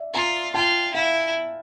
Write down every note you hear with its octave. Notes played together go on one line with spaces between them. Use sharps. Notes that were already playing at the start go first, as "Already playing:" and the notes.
Already playing: D5 E5
F4 G#5 A#5
F4 G5 A5
E4 F5 G5